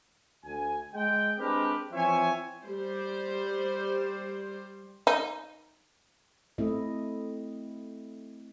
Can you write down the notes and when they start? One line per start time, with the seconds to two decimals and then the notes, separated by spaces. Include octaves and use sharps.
0.45 D2 G#5
0.94 G#3 G5
1.39 G#3 C4 D4 G4 A#4 B4
1.93 E3 F3 C4 C#5 E5 G#5
2.66 G3 C5
5.07 D#4
6.58 A3 C4 E4 D#5